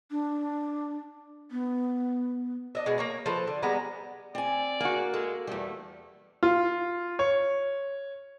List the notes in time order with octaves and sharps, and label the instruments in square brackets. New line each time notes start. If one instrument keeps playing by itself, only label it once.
[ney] D4
B3
[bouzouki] D4 D#5 E5
B2 G#3
A#3 C#5 A#5
F3 A4 B4
D3
G3 G#3 B3 A#5
[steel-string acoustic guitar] C4 G#5 [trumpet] D5
[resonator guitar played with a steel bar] A#3 F#4 [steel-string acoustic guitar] G#4
[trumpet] G#3 [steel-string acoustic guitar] A4
[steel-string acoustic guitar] E2 G3 [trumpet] A3
[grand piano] F4
C#5